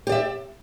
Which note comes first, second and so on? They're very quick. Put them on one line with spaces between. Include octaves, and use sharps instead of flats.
G4 D5 E5